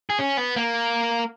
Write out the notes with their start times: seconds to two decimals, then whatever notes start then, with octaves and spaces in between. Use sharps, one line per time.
0.10 G#4
0.19 C#4
0.37 B3
0.56 A#3